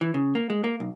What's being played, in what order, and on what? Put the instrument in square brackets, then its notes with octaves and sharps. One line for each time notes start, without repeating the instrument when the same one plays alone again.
[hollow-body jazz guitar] E3
C#3
A#3
G#3
A#3
B1